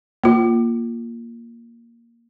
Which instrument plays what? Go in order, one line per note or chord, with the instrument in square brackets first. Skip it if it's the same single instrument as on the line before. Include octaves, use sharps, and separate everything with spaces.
[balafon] A#3 F4